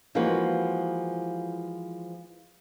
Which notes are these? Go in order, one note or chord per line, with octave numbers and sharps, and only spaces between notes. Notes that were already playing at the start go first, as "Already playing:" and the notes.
E3 F3 G#3 A#3 F#4 B4